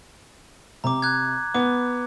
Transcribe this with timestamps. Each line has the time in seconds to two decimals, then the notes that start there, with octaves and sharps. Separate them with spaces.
0.84 C3 A#5 D6
1.02 F#6 G#6
1.54 B3 D6